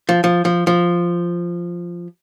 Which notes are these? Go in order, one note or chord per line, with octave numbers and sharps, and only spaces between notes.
F3
F3
F3
F3